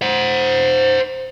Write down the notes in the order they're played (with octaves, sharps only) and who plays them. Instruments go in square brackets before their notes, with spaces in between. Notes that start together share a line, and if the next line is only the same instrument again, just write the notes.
[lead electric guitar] C5 F#5